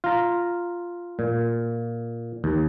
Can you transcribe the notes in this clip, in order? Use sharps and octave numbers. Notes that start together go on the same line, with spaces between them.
F4 A#5
A#2
D#2